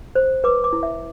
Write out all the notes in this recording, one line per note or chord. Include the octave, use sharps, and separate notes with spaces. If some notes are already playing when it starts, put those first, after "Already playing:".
C5
B4 D6
D6
E4
E5